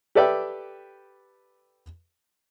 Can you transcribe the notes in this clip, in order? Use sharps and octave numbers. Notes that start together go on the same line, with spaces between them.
G4 A4 B4 D5 E5 G5